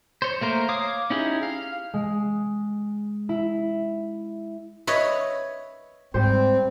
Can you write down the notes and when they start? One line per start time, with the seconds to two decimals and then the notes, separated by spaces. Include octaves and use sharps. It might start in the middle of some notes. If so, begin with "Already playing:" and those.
0.22 C5 C#5
0.41 A3 A#3 A#4 C5
0.69 C#5 F5 D6 D#6
1.10 C#4 D#4 E4 G4 G#4
1.43 F5
1.94 G#3
3.29 E4
4.87 B4 C#5 D#5 E5
6.14 G#2 G3 C4 C5